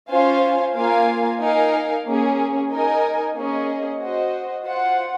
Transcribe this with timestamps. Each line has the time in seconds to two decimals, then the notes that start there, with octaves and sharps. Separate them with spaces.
0.09 C#4 F4 C5 F5 G#5
0.75 A#3 F4 A#4 F5 G#5
1.39 D#4 A#4 F5 G#5
2.04 A#3 C#4 G#4
2.70 D#4 A#4 D#5 G#5
3.34 A#3 C#4 G#4 D#5
3.99 F#4 C5 D#5
4.64 F4 C5 F#5